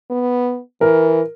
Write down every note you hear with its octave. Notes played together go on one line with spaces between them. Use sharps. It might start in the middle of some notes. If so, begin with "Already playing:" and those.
B3
E3 A#4